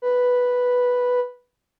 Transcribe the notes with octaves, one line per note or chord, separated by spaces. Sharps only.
B4